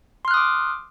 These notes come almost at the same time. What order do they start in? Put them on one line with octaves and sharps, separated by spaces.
C6 F6 F#6 D#6 D6